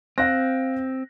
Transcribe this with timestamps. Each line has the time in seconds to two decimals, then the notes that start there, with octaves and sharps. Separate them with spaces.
0.18 C4 F5 F#6 A#6